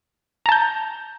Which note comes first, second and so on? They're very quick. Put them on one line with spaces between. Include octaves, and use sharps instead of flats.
A#5 A5 G6